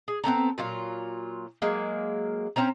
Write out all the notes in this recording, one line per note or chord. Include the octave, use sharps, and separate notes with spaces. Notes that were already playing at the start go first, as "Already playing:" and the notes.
G#4
B3 C4 A4 A#5
A#2 F#3 F4
F#3 G#3 A#3
C4 C#4 C5 A#5